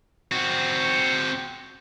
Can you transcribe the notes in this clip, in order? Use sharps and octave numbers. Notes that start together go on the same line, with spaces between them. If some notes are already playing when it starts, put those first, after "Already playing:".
C4 F#4